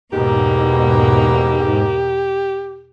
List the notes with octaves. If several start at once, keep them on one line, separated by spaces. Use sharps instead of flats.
E2 G#2 B2 A#3 G4